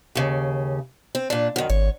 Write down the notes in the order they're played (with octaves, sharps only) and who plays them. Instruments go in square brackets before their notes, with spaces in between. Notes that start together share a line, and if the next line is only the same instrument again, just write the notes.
[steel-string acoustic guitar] D#2 C#3
C4
A#2 D4
F#2 D#3
[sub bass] G#1 [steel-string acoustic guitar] C#5